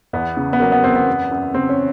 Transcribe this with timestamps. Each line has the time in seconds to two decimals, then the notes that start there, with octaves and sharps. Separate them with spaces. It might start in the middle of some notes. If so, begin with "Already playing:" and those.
0.13 E2 B3
0.37 C#3
0.53 B3
0.60 F#3 A#3
0.72 B3
0.84 E2 C4
0.95 B3
1.07 F#2
1.31 F#2
1.54 C#3 C4
1.69 C#4